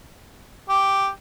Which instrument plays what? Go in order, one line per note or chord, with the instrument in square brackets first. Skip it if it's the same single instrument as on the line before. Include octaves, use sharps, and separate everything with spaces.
[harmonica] G4